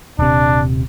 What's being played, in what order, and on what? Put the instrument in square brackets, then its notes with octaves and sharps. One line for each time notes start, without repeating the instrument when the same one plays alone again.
[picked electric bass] D#1 C3 [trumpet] D4